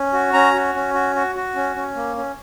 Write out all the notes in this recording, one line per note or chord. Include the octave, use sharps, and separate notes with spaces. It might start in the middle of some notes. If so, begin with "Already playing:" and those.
Already playing: C#4
F#4
C#4 A#5
F#4
C#4
F#4
F#4
F#4
C#4
C#4
A#3
C#4